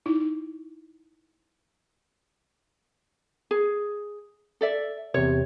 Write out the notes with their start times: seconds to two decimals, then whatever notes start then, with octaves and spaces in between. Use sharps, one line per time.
0.06 D#4 E4
3.51 G#4
4.61 A4 D5 E5
5.14 E2 C3 C#5